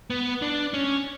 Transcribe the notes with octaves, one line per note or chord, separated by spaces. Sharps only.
B3
D4
C#4